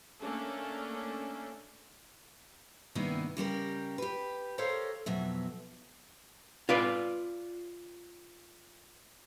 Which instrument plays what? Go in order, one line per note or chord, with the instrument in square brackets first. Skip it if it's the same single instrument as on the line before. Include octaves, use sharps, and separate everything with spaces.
[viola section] A3 A#3 C#4 D4 A4
[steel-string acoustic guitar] G2 C3 D#3 A#3 B3 E4
C#3 G3 G4 A#4
G4 B4
G4 A4 A#4 C5 C#5 F5
F2 B2 F#3 E5
[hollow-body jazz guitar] F4 B4 D5